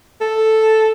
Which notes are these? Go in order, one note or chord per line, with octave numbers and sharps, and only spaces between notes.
A4